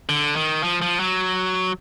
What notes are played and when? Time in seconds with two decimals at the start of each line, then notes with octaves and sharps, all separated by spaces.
0.09 D3
0.36 D#3
0.63 F3
0.82 F3
1.00 F#3